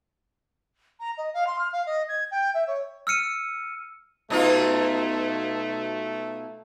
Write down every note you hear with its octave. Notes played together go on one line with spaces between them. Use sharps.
A#5
D#5
F5
C6
F6
F5
D#5
G#6
G5
E5
C#5
E6 F6 C#7 D#7
B2 A3 D#4 F4